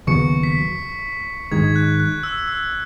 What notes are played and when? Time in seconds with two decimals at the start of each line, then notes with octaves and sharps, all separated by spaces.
0.07 D#2 C#3 F#3 B3 C#6 C#7
0.43 B6
1.51 G#2 D#3 G#3 G#6
1.76 F#6
2.00 F#6
2.23 E6
2.48 E6